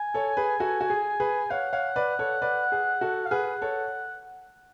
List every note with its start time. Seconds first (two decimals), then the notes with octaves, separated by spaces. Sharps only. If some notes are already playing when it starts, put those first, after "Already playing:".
Already playing: G#5
0.14 A4 C#5
0.37 G#4 B4
0.60 F#4 A4
0.81 F#4
0.90 G#4
1.20 G#4 B4
1.50 C#5 F5 F#5
1.73 C#5 F5
1.96 B4 D5
2.19 A4 C#5
2.42 B4 D5
2.72 G#4
3.01 F#4 A4
3.26 F5
3.31 G#4 B4 F#5
3.62 A4 C#5